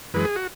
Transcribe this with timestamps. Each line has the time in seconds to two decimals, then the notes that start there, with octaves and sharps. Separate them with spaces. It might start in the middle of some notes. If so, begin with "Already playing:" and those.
0.14 F#2 E3 G#3 B4
0.25 G#4
0.36 F#4